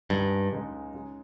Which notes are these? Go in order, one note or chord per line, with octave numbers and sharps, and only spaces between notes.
C#2 G2 C#3 G#3 D#4
C#2 C#3 G#3 D#4
C#3 G#3 D#4